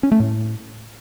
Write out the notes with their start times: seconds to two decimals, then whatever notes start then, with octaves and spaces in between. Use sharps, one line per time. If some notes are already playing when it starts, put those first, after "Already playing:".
0.03 C#4
0.12 A3
0.20 A2